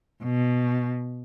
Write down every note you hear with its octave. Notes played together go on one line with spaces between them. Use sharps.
B2